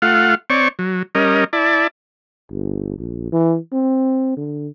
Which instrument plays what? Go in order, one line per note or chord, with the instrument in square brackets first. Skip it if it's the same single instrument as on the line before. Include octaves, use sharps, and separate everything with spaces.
[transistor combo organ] A3 F4 F5 F#5
C4 C#5 D5 C#6
F#3
G3 C#4 A#4 D#5
E4 D5 A5
[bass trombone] G1
A#1
E3
C4
D3